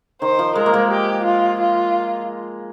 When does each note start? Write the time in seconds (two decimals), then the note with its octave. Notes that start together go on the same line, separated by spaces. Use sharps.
0.21 D#3 C5
0.39 F3
0.55 G#3 A#4
0.66 A#3
0.74 G#3
0.91 G4
1.25 F4
1.60 F4